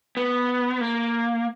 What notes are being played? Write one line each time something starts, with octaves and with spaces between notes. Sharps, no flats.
B3
A#3